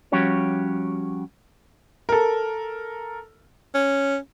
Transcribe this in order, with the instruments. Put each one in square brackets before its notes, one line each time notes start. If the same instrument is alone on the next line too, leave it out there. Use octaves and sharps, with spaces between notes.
[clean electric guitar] F3 G3 C#4 F#4 G4 C#5
[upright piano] A4 A#4
[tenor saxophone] C#4